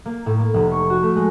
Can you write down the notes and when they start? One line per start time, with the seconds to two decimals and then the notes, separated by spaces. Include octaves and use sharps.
0.05 A#3
0.26 A2
0.39 A#3
0.54 F1
0.72 C#6
0.90 F#4
1.03 A3
1.16 G#3